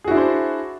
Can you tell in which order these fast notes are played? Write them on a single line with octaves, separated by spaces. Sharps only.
G#4 F#4 E4 D4 C5